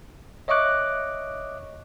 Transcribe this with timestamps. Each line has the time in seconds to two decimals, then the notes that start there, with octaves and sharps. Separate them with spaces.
0.48 C#5 D#5 E5 C#6 D6 F#6